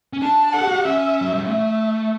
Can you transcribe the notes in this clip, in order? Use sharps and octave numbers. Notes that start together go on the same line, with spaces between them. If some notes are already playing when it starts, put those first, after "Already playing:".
C#4
D4 A5
A4 F#5
G4
F#4
G4
C#4 E5
F#3
G3
A3 E5